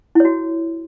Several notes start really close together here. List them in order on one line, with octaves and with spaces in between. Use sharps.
E4 C#5 F#4